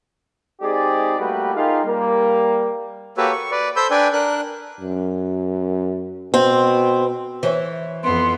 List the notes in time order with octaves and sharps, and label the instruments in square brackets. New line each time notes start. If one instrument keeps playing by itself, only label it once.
[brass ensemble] G#3 C4 D#4 G4 G#4 D5
G3 A3 A#3 F#4 G4 B4
D#4 F4 G4 G#4 A#4 F5
G3 A#3
[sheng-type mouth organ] A#3 F#4 G4 A4 B4 C#5
C#6
B4 D5
A4 C5 B5 E6 G6
D4 B4 D5 G5 G#5
D4 A#4 F#6
[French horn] F#2
[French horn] B2 [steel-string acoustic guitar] C4
[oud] E3 [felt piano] C5 C#5
[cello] F2 B3 [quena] C6